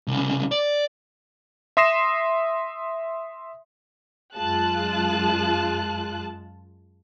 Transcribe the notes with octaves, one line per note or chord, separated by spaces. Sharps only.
C2 C#3
D5
E5 C6 D#6 A#6 C7 E7
F#2 G#3 F4 A5 F#6